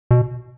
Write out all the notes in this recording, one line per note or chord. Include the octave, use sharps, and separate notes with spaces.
B2